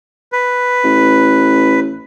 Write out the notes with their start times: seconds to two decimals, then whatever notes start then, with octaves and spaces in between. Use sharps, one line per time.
0.32 B4
0.84 A1